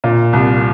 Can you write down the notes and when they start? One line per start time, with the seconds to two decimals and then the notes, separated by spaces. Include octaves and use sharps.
0.04 A#2
0.33 C2